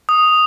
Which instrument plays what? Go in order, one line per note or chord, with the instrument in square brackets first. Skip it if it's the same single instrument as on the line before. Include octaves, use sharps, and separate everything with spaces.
[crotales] D#6